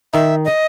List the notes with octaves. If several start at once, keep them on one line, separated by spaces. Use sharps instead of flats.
D#3 D#4 E5
D#5